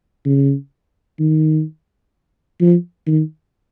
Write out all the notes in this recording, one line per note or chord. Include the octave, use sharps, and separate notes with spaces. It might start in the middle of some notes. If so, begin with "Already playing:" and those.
C#3
D#3
F3
D#3